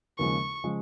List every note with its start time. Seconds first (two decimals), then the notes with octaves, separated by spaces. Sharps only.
0.18 D#2 C#3 F3 G#3 C#6
0.64 C#3 F3 G#3